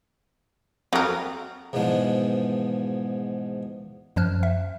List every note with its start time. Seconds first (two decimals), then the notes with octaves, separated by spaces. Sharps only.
0.93 F2 F#3 A#4
1.73 E2 G#2 B2 F3 G#3 D4
4.16 F#2 F3 C5 F6 F#6
4.43 E5